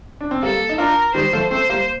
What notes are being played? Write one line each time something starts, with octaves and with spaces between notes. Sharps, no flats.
D4
C4
G3 A#3 A4
D#4
D4 F4 A#4
D#3 G3 C5
F3 A3
A3 C4 C5
G3 A#3